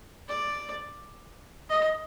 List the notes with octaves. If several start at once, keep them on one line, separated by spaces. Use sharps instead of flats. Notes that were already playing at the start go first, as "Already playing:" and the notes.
D5
D#5